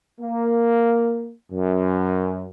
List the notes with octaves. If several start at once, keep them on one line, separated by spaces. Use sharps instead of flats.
A#3
F#2